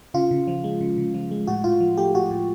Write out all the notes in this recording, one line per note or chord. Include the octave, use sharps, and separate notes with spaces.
C#3 F4
C#3
F3
G#3
C#3
C#3
F3
G#3
A2 F#4
A2 F4
F3
A3 G4
A2 F#4
A2